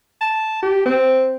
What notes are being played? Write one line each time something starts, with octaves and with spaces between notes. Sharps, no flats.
A5
G4
C4